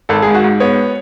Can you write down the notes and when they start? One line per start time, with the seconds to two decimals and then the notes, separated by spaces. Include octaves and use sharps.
0.09 G#1 A4
0.22 G#2 G#4
0.35 F#4
0.44 G#2
0.60 B3 C#5